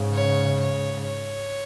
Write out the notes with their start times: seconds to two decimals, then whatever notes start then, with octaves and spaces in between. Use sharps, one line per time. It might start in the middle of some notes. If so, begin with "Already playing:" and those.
Already playing: G#2 C#3
0.14 C#5
0.60 C#5
1.06 C#5